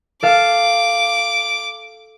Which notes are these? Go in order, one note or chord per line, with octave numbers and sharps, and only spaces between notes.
A4 F5 D6